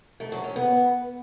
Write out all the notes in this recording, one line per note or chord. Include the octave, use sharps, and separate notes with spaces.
A3
F#3
C#4
B3